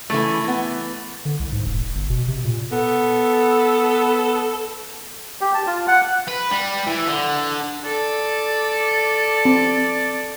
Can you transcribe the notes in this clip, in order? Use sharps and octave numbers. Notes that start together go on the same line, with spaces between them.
C#3 E3 A3
E3 B3
D3
C2
G#2
E1
D#1
G1
B2
C3
A#2
B3 A4
G4
A5
F4
F#5
B4
G3
E3
D3
A4 D5
C4